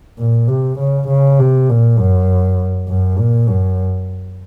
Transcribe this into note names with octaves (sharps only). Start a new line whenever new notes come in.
A#2
C3
C#3
C#3
C3
A#2
F#2
F#2
A#2
F#2